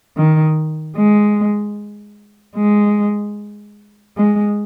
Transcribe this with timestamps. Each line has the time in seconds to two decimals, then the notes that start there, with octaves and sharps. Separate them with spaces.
0.16 D#3
0.96 G#3
2.55 G#3
4.16 G#3